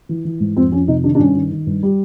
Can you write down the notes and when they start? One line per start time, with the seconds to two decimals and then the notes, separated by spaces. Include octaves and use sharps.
0.09 E3
0.25 E3
0.40 G#2
0.56 F2 C4
0.72 F2 C#4
0.88 C3 D#4
1.04 D#3 D4
1.15 D4
1.19 G2 C#4
1.35 D#3
1.51 D#3
1.67 G2
1.83 G3